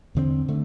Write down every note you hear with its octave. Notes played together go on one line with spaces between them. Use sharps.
E2 D3 A3 C4
D3 A3